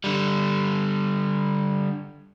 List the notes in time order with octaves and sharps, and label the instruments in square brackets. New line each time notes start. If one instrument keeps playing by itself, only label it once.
[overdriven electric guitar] D3 G3